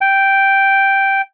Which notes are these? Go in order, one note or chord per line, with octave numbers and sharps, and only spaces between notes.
G5